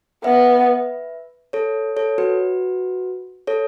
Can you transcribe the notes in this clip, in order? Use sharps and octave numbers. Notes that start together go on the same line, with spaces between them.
B3 B4 E5
A4 C#5
A4 C#5
F#4 B4
A4 C#5